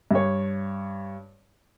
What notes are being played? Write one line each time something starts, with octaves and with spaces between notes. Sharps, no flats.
G2 C#5